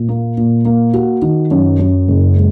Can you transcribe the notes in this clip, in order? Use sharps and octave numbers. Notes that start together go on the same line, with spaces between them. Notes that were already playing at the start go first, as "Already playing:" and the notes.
Already playing: A#2
A#3
A#2
A#3
F#4
D#3
F#2
F#2
F#1
G#3